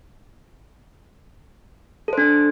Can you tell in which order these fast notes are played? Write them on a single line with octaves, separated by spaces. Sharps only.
A4 C5 D4